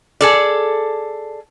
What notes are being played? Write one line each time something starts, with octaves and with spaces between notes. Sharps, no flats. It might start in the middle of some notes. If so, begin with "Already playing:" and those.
G#4 A4 D5